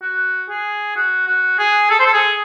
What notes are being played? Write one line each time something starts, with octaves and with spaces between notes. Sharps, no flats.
F#4
G#4
F#4
F#4
G#4
A4
C5
A4
G#4